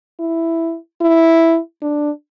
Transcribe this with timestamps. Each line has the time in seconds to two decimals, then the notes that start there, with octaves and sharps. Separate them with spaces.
0.19 E4
1.01 E4
1.82 D4